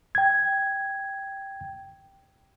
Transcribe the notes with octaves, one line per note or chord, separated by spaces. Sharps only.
G5 G#6